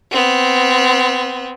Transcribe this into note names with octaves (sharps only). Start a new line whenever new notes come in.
B3 C4